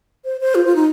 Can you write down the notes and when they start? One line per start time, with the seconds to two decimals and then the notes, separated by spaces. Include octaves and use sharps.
0.25 C5
0.41 C5
0.55 F4
0.65 F4
0.75 D#4